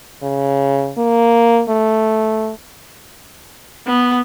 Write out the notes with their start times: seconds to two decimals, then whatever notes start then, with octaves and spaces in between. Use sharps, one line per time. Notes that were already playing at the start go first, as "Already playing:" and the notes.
0.23 C#3
0.97 A#3
1.69 A3
3.87 B3